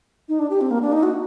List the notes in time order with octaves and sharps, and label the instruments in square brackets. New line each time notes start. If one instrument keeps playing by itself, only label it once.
[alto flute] D#4
D4
G4
C4
A#3
D4
D#4
F#4